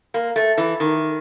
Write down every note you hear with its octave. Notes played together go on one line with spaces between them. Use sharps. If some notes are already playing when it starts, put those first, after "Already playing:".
A#3
A3
E3
D#3